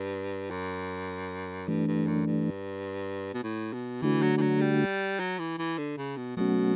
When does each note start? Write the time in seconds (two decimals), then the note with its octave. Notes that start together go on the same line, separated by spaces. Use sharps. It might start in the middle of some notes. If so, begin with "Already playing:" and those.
Already playing: G2
0.51 F#2
1.68 G2 E3 A3 D4
1.88 G2
2.07 F#2
2.27 G2
3.34 B2
3.44 A2
3.73 B2
4.02 D3 E3 A3 D4 F#4
4.22 F#3
4.38 E3
4.41 F#3
4.61 G3
5.19 F#3
5.39 E3
5.59 E3
5.78 D3
5.98 C#3
6.17 B2
6.37 B2 F#3 A3 C#4 F#4